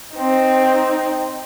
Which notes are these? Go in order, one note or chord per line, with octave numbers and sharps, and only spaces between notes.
C4 D#4